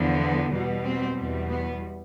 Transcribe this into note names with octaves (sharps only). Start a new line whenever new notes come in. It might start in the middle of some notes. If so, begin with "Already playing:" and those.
Already playing: E2 D3 F3
B3
B2 G3
C4
E2 B2 G3
B3